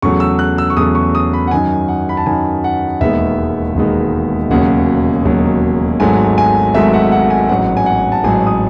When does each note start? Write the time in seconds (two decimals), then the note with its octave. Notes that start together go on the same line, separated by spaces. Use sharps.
0.02 E2 C#3 F#3 A3 C#6
0.20 E6
0.39 F#6
0.58 E6
0.70 C#6
0.77 E2 C#3 F#3 A3 D#6
0.95 C#6
1.15 D#6
1.33 B5
1.47 F#5
1.51 F#2 D#3 F#3 G#5
1.88 F#5
2.09 B5
2.17 A5
2.26 F#2 D#3 F#3 G#5
2.64 F#5
3.01 E1 D#2 D#3 G#3 B3 E5
3.75 E1 D#2 D#3 G#3 B3
4.50 E1 D#2 C#3 F#3 F#5
5.25 E1 D#2 C#3 F#3
6.00 G#1 G#2 F#3 A3 G#5
6.38 G#5
6.75 G#1 G#2 F#3 A3 E5
6.93 F#5
7.12 F#5
7.30 G#5
7.49 A1 G#2 F#3 F#5
7.77 G#5
7.86 F#5
8.12 A5
8.24 A1 G#2 F#3 G#5
8.47 D#6